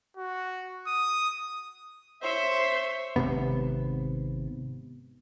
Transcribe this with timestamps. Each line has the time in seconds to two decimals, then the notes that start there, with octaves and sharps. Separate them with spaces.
0.17 F#4
0.87 D#6
2.22 C5 C#5 E5 C6
3.16 G#1 F2 C3 B3